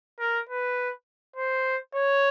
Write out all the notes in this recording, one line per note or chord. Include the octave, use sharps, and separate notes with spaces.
A#4
B4
C5
C#5